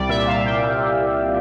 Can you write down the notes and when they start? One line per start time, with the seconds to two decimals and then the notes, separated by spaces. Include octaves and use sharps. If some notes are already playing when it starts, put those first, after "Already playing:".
Already playing: C2 G3 D5
0.09 A#2 E5
0.27 C2 F5
0.45 C2 G5
0.63 A#2